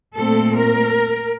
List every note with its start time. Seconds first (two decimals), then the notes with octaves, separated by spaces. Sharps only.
0.15 A#2 A3 C4 A4
0.54 A#4